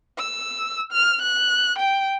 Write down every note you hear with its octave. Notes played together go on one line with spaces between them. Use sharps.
E6
F6
F#6
G5